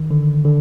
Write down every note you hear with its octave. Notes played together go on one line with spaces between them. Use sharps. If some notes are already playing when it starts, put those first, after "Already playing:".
Already playing: D#3
D3
D3